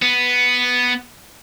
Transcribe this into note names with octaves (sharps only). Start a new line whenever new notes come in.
B3